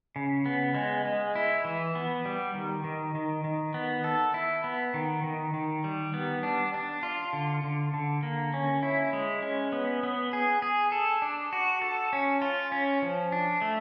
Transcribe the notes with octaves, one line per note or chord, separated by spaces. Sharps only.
C#3
B3
G#3
G#3
E4
E3
B3
G3
D#3
D#3
D#3
D#3
B3
A4
E4
B3
D#3
D#3
D#3
G3
B3
D4
D4
F4
D3
D3
D3
A#3
C#4
E4
G#3
C#4
B3
B3
G#4
G#4
A4
D4
F#4
A4
C#4
F4
C#4
F3
D4
A3